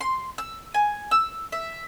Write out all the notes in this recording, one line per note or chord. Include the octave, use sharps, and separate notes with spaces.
C6
E6
G#5
E6
E5